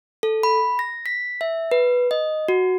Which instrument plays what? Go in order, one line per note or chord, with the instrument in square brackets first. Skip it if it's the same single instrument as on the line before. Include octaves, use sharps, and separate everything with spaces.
[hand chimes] A4
B5
A#6
B6
E5
B4
D#5
F#4